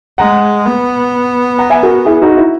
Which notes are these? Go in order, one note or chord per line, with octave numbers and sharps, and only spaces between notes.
G#3 F#5 A#5
B3
F#5 A#5
E5 G#5
F#4 A#4
E4 G#4
D#4 F#4
E4